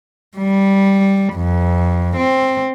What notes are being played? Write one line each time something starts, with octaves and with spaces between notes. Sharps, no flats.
G3
F2
C4